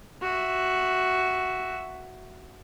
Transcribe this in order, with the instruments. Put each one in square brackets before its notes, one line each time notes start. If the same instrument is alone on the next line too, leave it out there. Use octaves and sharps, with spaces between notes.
[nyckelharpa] F#4 E5